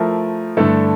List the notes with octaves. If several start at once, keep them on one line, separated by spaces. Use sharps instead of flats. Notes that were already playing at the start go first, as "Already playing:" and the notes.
Already playing: F3 A3 E4 A#4
G2 D3 A3 E4 A4